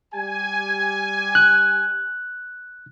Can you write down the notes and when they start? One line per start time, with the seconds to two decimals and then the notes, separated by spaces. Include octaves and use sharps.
0.13 G3 G4 G#5
1.35 F#6